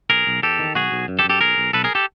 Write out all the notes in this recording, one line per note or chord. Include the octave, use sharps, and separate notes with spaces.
B1 G#4 A#4
B1
E2 G4 A4
D#3
B1 F#4 G#4
B1
F#2
G4 A4
F#2
G4 A4
B1 G#4 A#4
B1
B1 A4 B4
G#4 A#4
G4 A4